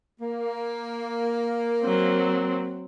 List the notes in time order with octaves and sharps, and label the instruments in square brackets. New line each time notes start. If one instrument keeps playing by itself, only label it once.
[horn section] A#3
[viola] F#3 C4